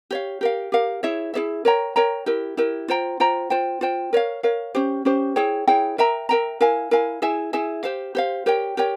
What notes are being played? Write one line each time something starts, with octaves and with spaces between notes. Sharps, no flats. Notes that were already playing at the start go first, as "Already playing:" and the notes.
G4 C#5 F5
G4 A#4 F5
G4 A#4 F5
E4 G#4 C#5 E5
E4 G#4 C#5 E5
A#4 C#5 G5 A#5
A#4 C#5 G5 A#5
E4 G4 A#4
E4 G4 A#4
F4 C5 G5 A#5
F4 C5 G5 A#5
F4 C5 G5
F4 C5 G5
A#4 C#5 F5
A#4 C#5 F5
C#4 G4 C5
C#4 G4 C5
E4 G#4 C#5 G5
E4 G#4 C#5 G5
A#4 E5 G5 A#5
A#4 E5 G5 A#5
E4 A#4 F5 G#5
E4 A#4 F5 G#5
E4 G#4 E5 G#5
E4 G#4 E5 G#5
G4 C5 F5
G4 C5 F5
G4 A#4 C#5 G5
G4 A#4 C#5 G5